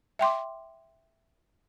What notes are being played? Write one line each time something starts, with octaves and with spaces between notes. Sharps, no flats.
E5 G5 C6 D6